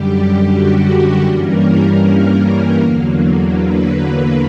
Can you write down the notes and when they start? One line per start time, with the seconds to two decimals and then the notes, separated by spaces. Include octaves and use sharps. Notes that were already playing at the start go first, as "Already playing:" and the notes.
Already playing: F#2 D3 G3 G4
0.49 F#4
1.25 G2 E3 G3 A#3 C#4 A#4
2.76 E2 D3 F#3 A#3
3.52 B4